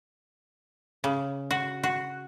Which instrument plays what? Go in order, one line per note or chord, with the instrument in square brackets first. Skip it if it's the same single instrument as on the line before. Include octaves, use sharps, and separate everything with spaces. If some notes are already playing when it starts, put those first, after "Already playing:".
[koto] C#3
F#4
F#4